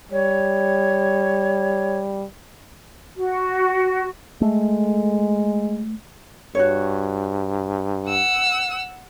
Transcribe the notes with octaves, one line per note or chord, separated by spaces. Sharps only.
G3 C#5
F#4
G#3 A3
G2 F#4 C#5
F#5 E6